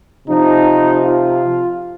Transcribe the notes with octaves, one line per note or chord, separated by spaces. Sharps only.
C3 F3 D#4
F4